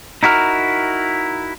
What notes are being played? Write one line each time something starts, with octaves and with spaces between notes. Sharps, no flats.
D#4 E4 F#4 A#4